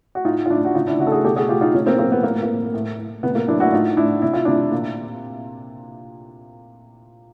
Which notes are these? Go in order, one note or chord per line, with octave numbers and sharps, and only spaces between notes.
F#4
A2 D#4 F4
F4
A2 D4 E4
F#4
C#3 D#4 F4
D4 E4
C#3 E4 F#4
A4
F#4 G#4
B2 G4 A4
F#4 G#4
B2 F4 G4
D#4 F4
C3 C#4 D#4
A#3 C4
F#3 A#3 C4
B3
A2 A#3
A#3
A2
A2
A2
C3 B3
A#3
F#3 D4 E4
E4 F#4
A2 D#4 F4
A2 D4 E4
C3 E4
F4
C3 D4 E4
A#2